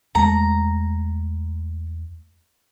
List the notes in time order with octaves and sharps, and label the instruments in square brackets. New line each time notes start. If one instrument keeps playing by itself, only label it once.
[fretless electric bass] E2 G#3 A3 [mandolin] A#5